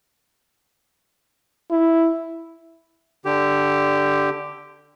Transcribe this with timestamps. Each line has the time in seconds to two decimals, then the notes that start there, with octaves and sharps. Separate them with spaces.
1.71 E4
3.25 D3 G4